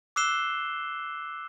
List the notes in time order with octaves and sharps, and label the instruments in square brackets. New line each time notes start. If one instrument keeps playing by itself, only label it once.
[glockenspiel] D6 E6 F#6 C7 E7 G7